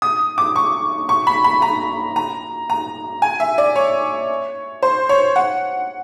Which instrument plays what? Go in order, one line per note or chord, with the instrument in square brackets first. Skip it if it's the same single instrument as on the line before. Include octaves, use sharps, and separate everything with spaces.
[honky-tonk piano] D#6
D6
C#6
C#6
B5
B5
A#5
A#5
A#5
G#5
E5
D5
C#5
C5
C#5
F#5